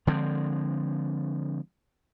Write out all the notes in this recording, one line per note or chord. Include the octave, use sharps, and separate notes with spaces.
D3 F3 G#3 C4